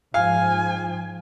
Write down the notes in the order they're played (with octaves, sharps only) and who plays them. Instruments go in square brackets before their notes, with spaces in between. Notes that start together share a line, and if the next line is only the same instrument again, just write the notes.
[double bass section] G#2 F3 [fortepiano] F5 [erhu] G#5